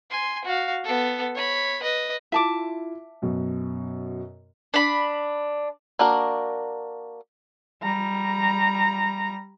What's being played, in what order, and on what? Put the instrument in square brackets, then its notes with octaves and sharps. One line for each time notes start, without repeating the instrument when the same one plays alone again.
[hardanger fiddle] G#5 C6
F#4 F5
B3 A4
C#5 B5
B4 D#5
[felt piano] E4 F4 [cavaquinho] E5 A5 D6
[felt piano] F#2 B2
[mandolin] D4 B5
[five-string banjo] A#3 D4 F#4 A#4
[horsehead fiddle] G3 A#5